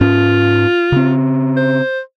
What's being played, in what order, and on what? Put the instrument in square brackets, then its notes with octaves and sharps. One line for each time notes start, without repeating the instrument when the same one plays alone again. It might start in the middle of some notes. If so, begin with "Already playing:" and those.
[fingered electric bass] G#2 C#4 [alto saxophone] F4
[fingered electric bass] C#3 C4
[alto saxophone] C5